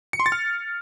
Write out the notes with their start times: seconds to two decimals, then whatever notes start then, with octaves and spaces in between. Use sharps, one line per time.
0.13 C#7
0.20 C6
0.26 A6
0.32 F6